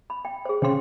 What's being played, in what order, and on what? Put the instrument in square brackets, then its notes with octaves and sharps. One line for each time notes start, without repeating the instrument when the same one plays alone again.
[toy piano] B5
G5
G#4 C5
[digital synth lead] C#3 [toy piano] C5 G5 C6